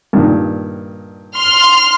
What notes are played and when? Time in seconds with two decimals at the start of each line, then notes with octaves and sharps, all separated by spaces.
0.13 G2 A#2 D#3
1.37 C6 F6